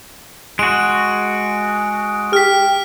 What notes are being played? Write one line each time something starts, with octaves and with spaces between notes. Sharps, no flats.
G#3 F#4 D7
G4 F6 B6